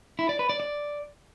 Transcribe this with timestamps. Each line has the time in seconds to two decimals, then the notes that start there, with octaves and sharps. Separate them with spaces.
0.19 E4
0.29 D5
0.39 B4
0.49 D5
0.60 D5